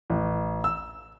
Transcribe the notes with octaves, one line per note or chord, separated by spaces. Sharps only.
A1
E6